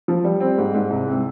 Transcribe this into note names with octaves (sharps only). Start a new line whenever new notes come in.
F3
G3
C4
G#2
G#2
C2
C3